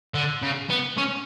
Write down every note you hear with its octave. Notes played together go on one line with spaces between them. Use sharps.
D3
C#3
B3
C#4